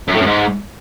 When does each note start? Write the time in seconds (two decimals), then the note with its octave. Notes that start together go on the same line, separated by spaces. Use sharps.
0.08 F#2
0.14 A2
0.20 F#2
0.26 G#2